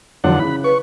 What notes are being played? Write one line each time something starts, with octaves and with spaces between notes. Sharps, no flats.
F2 D3 E3 F#3 F#5
C#3 E4 B5 F#6
B4 C#6